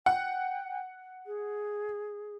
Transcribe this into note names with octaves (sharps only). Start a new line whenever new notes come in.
F#5 G5
G#4